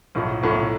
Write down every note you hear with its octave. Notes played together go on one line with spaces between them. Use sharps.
B1 A2 F3 A3
B1 A2 F3 A3